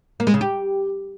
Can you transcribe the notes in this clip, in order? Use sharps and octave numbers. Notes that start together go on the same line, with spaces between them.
A#3
G#3
C#3
G4